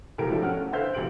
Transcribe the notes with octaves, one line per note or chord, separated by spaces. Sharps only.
A1 B2 F3 G4 A#4 D7
F3 F#3 A3 D4 E4 A4
C#4 F#5 F6
A3
D3 B4 C5 E5 F5 G6
A#1 B2 G4 D7 F#7